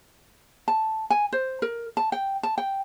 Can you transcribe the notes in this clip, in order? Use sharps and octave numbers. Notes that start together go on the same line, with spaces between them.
A5
G#5
C5
A#4
A5
G5
A5
G5